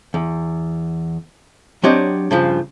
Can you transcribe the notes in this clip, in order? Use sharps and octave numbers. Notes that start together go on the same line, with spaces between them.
E2
F#3 C4 D4 G4 C#5 D#5
G2 C#3 F3